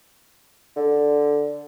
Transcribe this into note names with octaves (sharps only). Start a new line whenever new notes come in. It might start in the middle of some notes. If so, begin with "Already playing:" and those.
D3